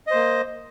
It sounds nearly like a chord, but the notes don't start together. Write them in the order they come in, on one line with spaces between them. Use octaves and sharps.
D#5 C5 A#3